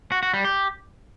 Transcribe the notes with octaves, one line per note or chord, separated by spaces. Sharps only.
F#4
F#4
G3
G4